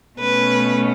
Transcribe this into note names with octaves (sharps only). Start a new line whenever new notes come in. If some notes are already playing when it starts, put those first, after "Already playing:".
B2 A3 C#4 B4